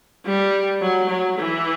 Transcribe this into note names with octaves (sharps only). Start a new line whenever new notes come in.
G3
F#3
F#3
E3